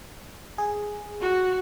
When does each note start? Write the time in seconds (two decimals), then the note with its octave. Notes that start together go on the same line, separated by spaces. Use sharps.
0.58 G#4
1.20 F#4